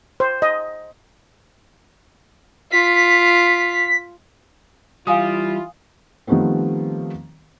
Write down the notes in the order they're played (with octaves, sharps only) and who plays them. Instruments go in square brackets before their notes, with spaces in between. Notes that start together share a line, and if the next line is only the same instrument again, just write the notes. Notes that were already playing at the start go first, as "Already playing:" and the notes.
[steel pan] C5
D#5
[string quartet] F4 [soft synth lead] B6
[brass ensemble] E3 E4 F4 [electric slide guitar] G3 [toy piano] F5 G#5 D#6
[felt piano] D#3 F3 G3 A3 B3 C4